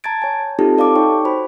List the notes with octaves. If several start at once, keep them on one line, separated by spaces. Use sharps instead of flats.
A5 A#5 G#6 A6 D7
C#5 G#5
C4 D#4 F4 G4 A4 A5
A4 D5 F5 A5 D6
D#4 C#5 G5 C#6
F#4 C5 B5